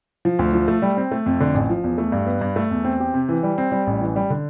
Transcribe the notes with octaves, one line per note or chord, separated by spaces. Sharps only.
F3
D2
F3
A3
G3
C4
A3
F2
D3
A1
F3
E2
A3
G2
B3
G2
A3
E2
C4
G4
C3
E3
G3
C4
G3
A1
E3
G3
D3